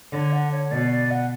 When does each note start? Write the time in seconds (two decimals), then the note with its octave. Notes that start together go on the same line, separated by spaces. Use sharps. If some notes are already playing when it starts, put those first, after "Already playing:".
0.12 D3 C#5
0.33 F#5
0.52 C#5
0.71 B2 D5
0.91 D5
1.11 F#5